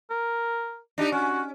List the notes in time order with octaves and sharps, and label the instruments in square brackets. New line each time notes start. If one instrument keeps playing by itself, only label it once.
[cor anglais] A#4
[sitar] D4 D#4 G4
[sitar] C#4 [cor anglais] F#4